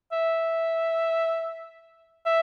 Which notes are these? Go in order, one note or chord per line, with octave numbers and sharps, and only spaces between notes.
E5
E5